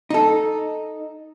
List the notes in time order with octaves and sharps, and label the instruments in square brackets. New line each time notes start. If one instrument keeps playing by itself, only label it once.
[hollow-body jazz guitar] D#4 A4